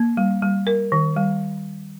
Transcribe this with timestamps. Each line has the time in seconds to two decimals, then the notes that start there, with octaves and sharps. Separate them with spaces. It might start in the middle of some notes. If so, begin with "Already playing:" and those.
Already playing: A#3
0.17 G3
0.42 G3
0.67 A#4
0.92 D#3
1.17 G3